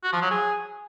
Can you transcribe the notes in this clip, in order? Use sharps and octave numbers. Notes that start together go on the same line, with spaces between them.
F#4
F3
F#3
G#4